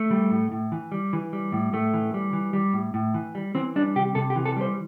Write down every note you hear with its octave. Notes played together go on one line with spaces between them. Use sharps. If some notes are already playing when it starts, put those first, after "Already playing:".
Already playing: A3
G3
A2
A2
E3
G3
E3
G3
A2
A2 A3
E3
G3
E3
G3
A2
A2
E3
G3
E3 C4
G3 D4
C3 G4
C3 A4
G4
E3
A4
G3 C5